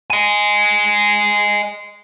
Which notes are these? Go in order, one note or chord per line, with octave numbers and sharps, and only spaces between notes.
D#5 G#5